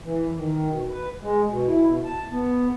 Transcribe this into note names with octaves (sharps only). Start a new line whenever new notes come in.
E3
D#3
B2
B4
G#3
B2
E4
B2
A5
B3